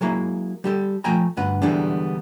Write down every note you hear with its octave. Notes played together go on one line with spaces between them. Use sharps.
F#3 G#3 A#3 E4
G3 G4 A4
F3 A3 G5 G#5 A#5
D2 G2 B4 F#5
D3 E3 G3 G#3 B3 D4